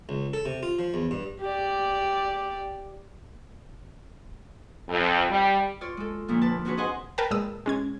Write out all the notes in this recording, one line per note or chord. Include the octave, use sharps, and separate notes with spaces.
C#2
A4
C3
F4
F3
E2
G2
G4 D5
F2
G3
F4 C#5 D5
G#3 A4
D#2 A#2 D3 F3 A#3
B4 A5
C4 D4 F#4 G#4 B4 C#5
G#4 C5 D#5 F#5 G#5
A#4 B4 G5 A5
A#2 G#3 D#6 E6
G#3 C#4 G#6